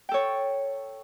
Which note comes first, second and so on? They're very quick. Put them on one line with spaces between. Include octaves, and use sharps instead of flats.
G5 A4 C#5